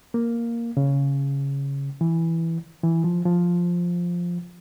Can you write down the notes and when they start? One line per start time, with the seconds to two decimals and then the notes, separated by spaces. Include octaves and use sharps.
0.14 A#3
0.77 C#3
2.01 E3
2.83 E3
3.04 F3
3.25 F3